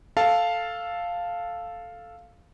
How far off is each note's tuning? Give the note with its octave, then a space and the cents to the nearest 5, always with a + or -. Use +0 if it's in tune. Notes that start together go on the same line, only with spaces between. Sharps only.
A4 +0 F5 +0 A5 +0